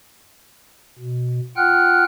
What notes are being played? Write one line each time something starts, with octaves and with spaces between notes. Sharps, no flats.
B2
F4 F#5 G5 F6 F#6